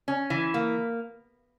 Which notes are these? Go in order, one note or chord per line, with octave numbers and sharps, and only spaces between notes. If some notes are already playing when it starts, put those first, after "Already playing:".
C#4
E3
A#3